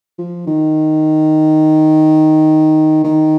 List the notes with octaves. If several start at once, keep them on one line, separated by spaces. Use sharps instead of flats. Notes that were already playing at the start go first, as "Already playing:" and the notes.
F3
D#3
D#3